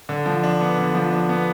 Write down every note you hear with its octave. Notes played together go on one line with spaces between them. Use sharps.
D3
F3
D4
B3
D3
F3
D4
B3